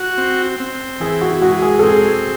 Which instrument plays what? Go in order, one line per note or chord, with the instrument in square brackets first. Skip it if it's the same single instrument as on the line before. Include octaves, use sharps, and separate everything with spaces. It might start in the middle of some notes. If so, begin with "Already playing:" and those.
Already playing: [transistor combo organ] F#4
C4
C4
[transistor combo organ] E3 [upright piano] G#4
[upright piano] F#4
[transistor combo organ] G#3 [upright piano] F#4
[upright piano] G#4
A4
[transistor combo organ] C4 [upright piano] G#4